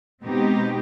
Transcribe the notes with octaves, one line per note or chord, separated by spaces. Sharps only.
B2 G#3 C4 D#4 G4